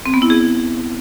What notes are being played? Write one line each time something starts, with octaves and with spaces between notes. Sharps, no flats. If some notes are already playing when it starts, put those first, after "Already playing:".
C4
B3
E4
G#4